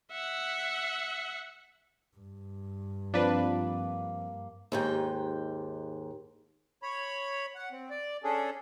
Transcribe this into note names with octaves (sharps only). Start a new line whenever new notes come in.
E5 F#5
G2
F3 A#3 C4 D4 B4
D#2 G#2 G5
C#5 B5
F#5
C4
D5
C#4 D4 G#4 A4